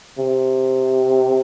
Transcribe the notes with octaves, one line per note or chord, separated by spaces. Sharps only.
C3